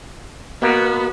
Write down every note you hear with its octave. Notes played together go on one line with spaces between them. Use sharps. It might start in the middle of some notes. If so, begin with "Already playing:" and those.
B2 A#3 B3 F#4